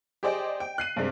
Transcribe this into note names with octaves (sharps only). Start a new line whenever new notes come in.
G4 G#4 C5 D5 D#5 G5
G5
F#6 C7 D#7
G2 C3 G3 G#3 C4